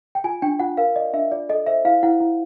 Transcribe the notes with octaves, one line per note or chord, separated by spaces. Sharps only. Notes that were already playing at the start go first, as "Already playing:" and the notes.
G5
F4 G#5
D4 G5
F4 F#5
A#4 F5
D5 D#5
D4 E5
F4 D5
A4 D#5
C5 E5
E4 F5
E4 F#5
E4